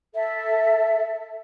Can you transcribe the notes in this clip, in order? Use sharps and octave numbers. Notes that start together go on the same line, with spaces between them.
A4 E5